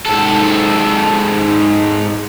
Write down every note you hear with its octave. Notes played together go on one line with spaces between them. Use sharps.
G#2 A4